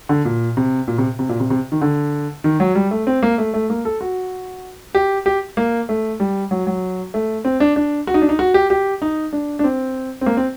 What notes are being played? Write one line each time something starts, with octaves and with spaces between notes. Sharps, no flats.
D3
A#2
C3
A#2
C3
C3
A#2
C3
C3
D#3
D3
D#3
F#3
G3
A3
C4
A#3
A3
A3
A#3
A4
F#4
G4
G4
A#3
A3
G3
F#3
F#3
A3
C4
D4
D4
F#4
D#4
D4
D#4
F#4
G4
G4
D#4
D4
D4
C4
C4
A#3
C4